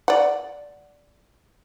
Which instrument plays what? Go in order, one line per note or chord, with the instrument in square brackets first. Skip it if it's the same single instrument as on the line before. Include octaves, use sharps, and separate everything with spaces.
[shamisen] D5 F#5